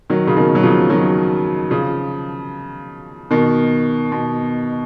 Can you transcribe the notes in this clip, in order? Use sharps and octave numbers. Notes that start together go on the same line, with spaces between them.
D#3 F#3
C#3
B2 D#3
F#3
C#3 F3
D#3 F#3
C#3 F3
B2 D#3
B2